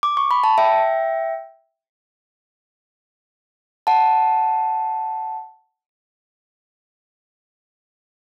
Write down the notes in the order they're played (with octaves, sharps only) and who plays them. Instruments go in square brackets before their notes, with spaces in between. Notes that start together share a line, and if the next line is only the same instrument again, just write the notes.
[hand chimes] D6
C#6
B5
A5
E5 G5
F#5 A5